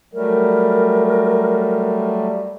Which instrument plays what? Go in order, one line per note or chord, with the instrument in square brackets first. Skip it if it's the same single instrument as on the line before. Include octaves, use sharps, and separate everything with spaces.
[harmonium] F#3 G3 A3 [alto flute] A#4